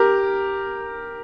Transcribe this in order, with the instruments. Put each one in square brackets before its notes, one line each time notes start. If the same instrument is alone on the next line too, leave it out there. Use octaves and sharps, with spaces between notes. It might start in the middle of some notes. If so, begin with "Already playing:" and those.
Already playing: [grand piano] G4 A#4